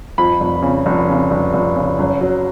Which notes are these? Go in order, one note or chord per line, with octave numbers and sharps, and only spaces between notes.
F2 B5
F1
C#3
F1
C#3
F1
F1
C#3
F#1
F#3